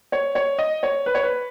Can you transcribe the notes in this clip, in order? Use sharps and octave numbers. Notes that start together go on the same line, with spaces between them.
C#5
C#5
D#5
C#5
B4
C#5
B4